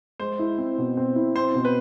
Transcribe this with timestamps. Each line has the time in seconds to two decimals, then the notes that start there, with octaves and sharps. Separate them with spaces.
0.20 G#3 C5
0.39 E4
0.58 C4
0.78 B2
0.97 C4
1.16 E4
1.36 C4 C5
1.55 B2
1.65 B4